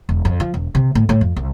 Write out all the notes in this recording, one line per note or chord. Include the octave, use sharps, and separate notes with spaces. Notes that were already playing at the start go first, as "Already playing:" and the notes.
E1
F2
F3
E1
C3
A2
A2
F2
C2